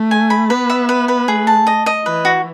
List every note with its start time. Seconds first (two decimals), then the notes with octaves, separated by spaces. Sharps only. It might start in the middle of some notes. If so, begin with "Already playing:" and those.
Already playing: A3
0.11 G#5
0.30 B5
0.50 B3 B4
0.70 E5
0.89 B4
1.08 B4
1.28 A3 G#4
1.47 A5
1.67 D#5
1.86 D#5
2.06 E3 B4
2.25 F#4